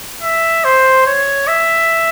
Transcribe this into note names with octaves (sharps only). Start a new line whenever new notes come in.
E5
C5
C#5
E5